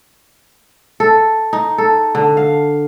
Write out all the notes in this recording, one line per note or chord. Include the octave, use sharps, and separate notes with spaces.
A4
D#4
A4
D3
F5